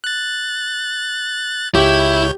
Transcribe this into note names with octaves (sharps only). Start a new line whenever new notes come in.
F#6 A6
C#2 E4 G4 C#5 G6